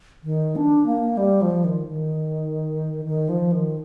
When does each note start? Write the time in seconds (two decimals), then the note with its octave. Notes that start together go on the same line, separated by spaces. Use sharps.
0.24 D#3
0.56 D4
0.86 A#3
1.17 G3
1.41 F3
1.64 D#3
1.88 D#3
3.05 D#3
3.29 F3
3.52 D#3